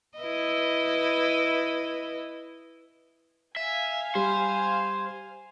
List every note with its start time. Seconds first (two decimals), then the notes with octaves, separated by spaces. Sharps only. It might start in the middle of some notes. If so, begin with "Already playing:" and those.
0.18 E4 B4 D#5
3.57 E5 F5 G#5
4.15 G3 C5